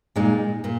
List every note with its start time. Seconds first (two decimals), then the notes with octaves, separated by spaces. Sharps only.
0.16 A#2 G#3 D#4
0.64 A#2